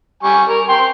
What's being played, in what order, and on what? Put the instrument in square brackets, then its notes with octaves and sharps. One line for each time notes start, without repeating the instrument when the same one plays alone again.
[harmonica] G3 G#5 C#6
A#4
G5 C6